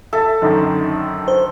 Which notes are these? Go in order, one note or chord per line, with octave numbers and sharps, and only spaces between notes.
A4 E5
F#2 D3 D#3
C5